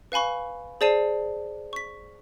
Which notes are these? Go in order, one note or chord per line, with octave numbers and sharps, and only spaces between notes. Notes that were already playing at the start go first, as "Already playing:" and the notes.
B4 F5 G#5 B5 C#6
G#4 C5 D5 A5 C7 D#7
C#6 B6